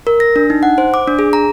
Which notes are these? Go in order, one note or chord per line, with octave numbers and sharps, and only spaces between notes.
A#4
A#6
D4
D#4
F#5
C5
D6
D4
G#4
A#5